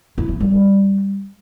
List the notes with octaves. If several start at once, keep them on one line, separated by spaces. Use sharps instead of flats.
E4
F3
G3